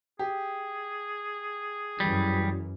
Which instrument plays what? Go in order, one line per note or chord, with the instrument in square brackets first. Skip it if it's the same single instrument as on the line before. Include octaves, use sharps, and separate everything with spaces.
[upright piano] G4 [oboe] G#4
[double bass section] F#2 E3 [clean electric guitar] G3